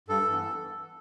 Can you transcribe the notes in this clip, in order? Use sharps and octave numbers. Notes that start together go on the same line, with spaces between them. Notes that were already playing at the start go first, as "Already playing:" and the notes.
G2 A4
E3 B3